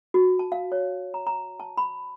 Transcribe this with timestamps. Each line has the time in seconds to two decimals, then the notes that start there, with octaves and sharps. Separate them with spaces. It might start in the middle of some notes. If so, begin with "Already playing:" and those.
0.14 F#4
0.39 A5
0.52 F5
0.72 C#5
1.14 A#5
1.27 A#5
1.60 A5
1.77 B5